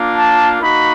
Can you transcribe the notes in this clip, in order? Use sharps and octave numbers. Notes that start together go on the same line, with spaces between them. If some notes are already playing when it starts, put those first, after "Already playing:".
Already playing: A#3 D4 F4
A5
A#3 D#4 F#4 B5